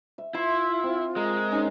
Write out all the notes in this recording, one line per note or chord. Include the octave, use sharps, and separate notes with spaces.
E5
E4 F4 C6
C4
G#3 A#4
C#4 D#4